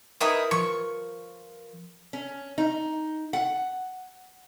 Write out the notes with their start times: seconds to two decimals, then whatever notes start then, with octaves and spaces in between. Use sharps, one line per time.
0.21 D#4 E4 A#4 B4 D#6
0.51 F3 C#6
2.13 C#4
2.58 D#4
3.33 F#5